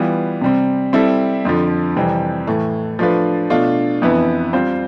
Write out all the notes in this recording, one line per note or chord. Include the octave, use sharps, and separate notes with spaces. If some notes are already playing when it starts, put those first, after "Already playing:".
Already playing: E3 G3 B3 F4
C3 G3 C4
G3 C4 E4 A4
F2 D3 F3
F2 C3 E3 G3 C4
A2 E3 A3
F3 A3 D4 F4 B4
B2 A3 D4 F4
F2 E3 B3 E4 B4
G3 C4 F4 C5